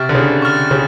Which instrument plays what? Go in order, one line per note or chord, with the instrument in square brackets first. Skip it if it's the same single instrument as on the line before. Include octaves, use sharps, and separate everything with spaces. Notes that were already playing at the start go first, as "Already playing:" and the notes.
Already playing: [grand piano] C3 [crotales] C#6 F6 A6
[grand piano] D3
C#3
[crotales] C#6 F6 A6
[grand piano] C#3